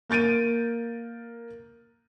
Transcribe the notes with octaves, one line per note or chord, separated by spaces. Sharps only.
A#3 G6 A6 D7 D#7